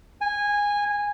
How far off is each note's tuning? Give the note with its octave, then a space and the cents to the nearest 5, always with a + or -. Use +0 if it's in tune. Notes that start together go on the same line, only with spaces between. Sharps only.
G#5 -15